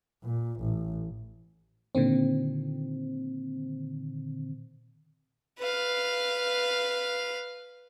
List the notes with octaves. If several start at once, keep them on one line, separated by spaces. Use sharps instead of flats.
A#2
A1
A#2 D3 D#3 C4
B4 F5